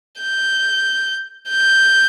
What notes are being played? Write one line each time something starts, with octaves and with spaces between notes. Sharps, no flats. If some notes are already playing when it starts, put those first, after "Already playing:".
G6
G6